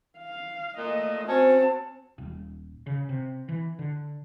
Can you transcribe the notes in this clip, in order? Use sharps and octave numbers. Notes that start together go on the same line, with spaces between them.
F5
A#2 A3 D#5
C4 C#4 F#4 C5 A5
D#1
C#3
C3
E3
D3